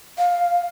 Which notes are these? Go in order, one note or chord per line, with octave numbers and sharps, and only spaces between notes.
F5